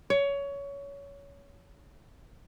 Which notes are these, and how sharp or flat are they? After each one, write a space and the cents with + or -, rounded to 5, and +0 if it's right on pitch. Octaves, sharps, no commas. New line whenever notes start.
C#5 +20